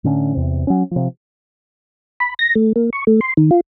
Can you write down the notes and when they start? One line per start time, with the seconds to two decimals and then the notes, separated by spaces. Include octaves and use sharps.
0.04 A2 D3 C#4
0.35 E2 C3
0.67 F#3 C#4
0.91 C3 F3
2.20 B5
2.39 A#6
2.55 A3
2.76 A#3
2.93 C#6
3.07 A3
3.21 C6
3.37 D#3
3.51 F4